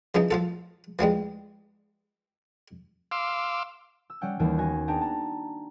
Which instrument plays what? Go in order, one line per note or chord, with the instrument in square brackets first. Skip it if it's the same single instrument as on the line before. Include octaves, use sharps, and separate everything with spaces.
[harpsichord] C#3 E3 F3 D#4
F3 F4 A4
E3 F3 G3 G#3
[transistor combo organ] F5 C6 D6 E6
[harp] E6
G3 C#4 F#5 G5 F6
D#2 E3 G3
B3 F#4 D#5 G#5 A#6
B3 D4 G#4 G5 A5 A#5
A5 A#5